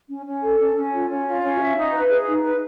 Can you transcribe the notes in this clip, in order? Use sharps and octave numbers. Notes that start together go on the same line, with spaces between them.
C#4
C#4
A4
C#4
C#4
F4
C#4
F4
C#4
E5
D#4
B4
G#4
D#4
B4